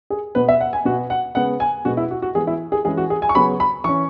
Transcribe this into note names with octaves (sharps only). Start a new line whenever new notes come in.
G#4
B2 B3 B4
E5
F#5
G#5
B2 B3 F#4
F#5
C#3 G#3 B3 F#5
G#5
B2 G#3 B3 F#4
E4
F#4
F#4
E3 G#3 B3 G#4
E4
G#4
E3 G#3 C#4 G#4
F#4
G#4
G#5
C#6
C#3 F#3 B3 B5
B5
E3 C#4 C#6